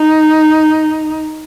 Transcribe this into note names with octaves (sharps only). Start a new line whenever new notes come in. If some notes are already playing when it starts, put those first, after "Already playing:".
Already playing: D#4